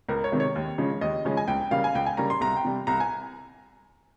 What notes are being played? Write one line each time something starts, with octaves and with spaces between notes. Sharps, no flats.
C#2 A#4
C#5
C3 D#3 G#3
C#5
D#2
C#3 F3 G#3 C#4
D#2 D#5
C#3 F3 G#3 C#4
G#5
C#2 G5
C#3 G3 A#3 C#4 F5
G#5
C#2 G5
G#5
C#3 G3 A#3 C#4 A#5
C6
C2 A#5
G5
C3 G3
C2 A#5
G#5